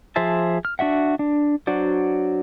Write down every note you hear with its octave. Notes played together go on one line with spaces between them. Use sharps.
F3 G#4 C5 E5 A5
F6
D4 F#4 E5 F#5
D4
F#3 D4 F#4 C5 D5